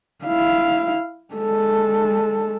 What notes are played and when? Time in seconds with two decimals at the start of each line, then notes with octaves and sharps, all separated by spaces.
0.25 E4 F5
1.34 G#3 A4